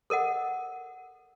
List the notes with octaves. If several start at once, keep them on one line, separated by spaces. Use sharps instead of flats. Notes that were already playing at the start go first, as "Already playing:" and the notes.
A4 A#4 D#5 F#5